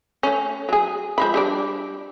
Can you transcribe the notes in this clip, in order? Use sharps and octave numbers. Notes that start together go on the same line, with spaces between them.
A3 C#4
F#3 G#4
F3 G#3 B5
G3 D4 D5